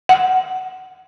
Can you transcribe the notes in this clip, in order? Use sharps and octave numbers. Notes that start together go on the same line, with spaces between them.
F#5